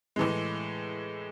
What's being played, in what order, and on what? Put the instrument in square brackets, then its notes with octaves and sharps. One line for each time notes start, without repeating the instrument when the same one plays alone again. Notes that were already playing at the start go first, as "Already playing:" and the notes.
[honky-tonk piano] A2 E3 G#3